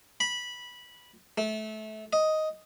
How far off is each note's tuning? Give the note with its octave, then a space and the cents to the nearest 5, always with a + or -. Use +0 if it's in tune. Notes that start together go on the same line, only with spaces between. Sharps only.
B5 -15
A3 -25
D#5 +5